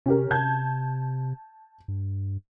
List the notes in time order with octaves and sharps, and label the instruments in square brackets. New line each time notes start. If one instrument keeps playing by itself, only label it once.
[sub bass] C3 [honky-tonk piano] C#4 G4 A#4
[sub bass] C3 [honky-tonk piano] A5 G6 G#6
[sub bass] G2